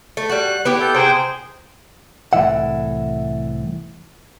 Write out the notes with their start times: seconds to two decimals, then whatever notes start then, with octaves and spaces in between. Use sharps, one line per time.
0.17 A3
0.30 G3 F#4 F#6
0.65 B3 E4 G4
0.80 A4 G6
0.95 C3 G#4 C5 G5
2.33 C2 A2 D#3 E3 E5 F#5